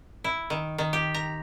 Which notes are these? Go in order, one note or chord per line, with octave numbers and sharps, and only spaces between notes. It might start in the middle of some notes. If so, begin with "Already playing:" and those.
E4
D#3
D#3
G4
A#5